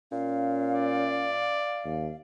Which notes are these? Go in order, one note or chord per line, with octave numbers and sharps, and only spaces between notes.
A#2 C#4 F5
D5
D#2